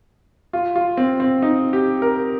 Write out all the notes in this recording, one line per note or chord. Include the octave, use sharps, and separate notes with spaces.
F4
F4
C4
C4
D#4
G4
A#4